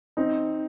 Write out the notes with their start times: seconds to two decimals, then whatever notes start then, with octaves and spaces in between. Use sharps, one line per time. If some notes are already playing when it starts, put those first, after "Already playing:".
0.17 C4 D#4